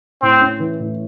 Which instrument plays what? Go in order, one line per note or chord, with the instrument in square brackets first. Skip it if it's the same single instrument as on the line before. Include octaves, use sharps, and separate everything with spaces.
[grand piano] A2 [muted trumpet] C4
[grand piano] C#4
E3
A2